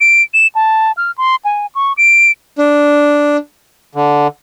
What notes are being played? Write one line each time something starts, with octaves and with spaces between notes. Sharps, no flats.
D7
E7
A5
F6
C6
G#5
C#6
D7
D4
D3